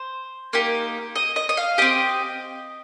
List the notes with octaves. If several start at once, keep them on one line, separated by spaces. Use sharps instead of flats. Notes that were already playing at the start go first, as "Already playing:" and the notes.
Already playing: C5
A#3 D#4 G4
D#5
D#5
D#5
F5
C4 G4 D#5